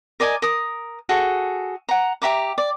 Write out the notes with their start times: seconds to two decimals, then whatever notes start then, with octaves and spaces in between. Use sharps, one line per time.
0.20 A#4 D5 D#5 G#5
0.42 A#4 D#6
1.09 F#4 G#4 A4
1.89 F#5 A#5
2.22 G4 E5 A#5 D6
2.58 D5